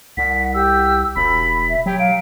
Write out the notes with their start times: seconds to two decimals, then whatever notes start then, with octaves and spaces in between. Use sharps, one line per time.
0.17 C2 F#5 B6
0.54 G4 E6
1.16 E1 B5 B6
1.69 E5
1.86 F#3 G4 G5
1.99 F5 D7